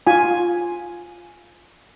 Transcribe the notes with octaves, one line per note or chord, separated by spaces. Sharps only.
F4 G#5